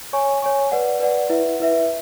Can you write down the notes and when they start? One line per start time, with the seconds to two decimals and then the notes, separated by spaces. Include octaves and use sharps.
0.13 C#5 G#5 C#6
0.42 C#5 G#5 C#6
0.72 B4 D5 F#5
1.00 B4 D5 F#5
1.30 E4 B4 E5
1.60 E4 B4 E5